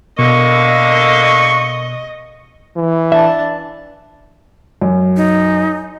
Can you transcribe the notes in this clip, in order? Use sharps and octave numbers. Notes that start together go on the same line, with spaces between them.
B2 D3 A#3 D#5 C#6
E3
D4 E5 A5
F#2
D#4